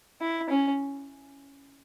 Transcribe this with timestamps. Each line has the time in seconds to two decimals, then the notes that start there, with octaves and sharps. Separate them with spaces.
0.21 E4
0.50 C#4